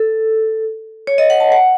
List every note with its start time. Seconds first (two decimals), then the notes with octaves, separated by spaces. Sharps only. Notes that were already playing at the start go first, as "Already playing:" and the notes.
Already playing: A4
1.07 C#5
1.18 D#5
1.30 F#5
1.40 A5
1.52 F#5